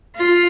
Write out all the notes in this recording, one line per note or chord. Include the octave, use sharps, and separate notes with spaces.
F4